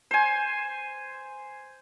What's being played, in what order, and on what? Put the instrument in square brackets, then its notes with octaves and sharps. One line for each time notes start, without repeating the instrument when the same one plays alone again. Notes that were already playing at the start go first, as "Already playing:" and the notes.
[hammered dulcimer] C5 G#5